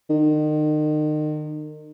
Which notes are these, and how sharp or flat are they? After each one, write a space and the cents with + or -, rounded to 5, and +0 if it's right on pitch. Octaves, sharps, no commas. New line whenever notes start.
D#3 -35